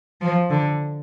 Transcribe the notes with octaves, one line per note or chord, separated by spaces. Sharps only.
F3
D3